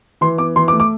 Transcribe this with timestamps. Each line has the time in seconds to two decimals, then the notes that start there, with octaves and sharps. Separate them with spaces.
0.21 E3 C6
0.38 B3 D6
0.56 E3 C6
0.68 D6
0.73 A3
0.80 D6